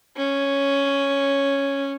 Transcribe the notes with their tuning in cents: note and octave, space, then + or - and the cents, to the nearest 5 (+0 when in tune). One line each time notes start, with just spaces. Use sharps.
C#4 +0